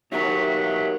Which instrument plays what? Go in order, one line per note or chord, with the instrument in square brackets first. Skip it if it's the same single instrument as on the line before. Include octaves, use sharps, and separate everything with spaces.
[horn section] B2 F#3 [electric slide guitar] D#4 G4 A#4 [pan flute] E5